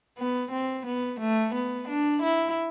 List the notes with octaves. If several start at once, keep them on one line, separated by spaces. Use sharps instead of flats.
B3
C4
B3
A3
B3
D4
E4